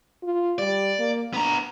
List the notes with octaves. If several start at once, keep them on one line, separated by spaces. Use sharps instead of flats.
F4
G3 D5
A#3
B3 D4 A#5